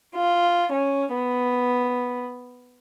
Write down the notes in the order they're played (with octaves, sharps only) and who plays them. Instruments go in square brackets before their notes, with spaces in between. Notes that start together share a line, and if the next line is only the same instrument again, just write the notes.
[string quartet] F4
C#4
B3